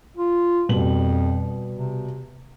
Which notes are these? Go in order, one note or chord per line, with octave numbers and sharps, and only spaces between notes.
F4
F2 B2 G3 F#7
C3